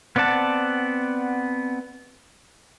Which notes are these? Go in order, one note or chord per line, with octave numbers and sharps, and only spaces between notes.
B3 C4 D5 F#5 A5